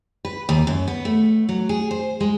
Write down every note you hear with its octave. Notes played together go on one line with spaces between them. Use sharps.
B4
D#2
F#2
B3
A3
F#3
G#4
C5
G#3